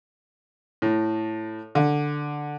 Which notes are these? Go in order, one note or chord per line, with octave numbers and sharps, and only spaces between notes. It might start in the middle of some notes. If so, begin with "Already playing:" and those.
A2
D3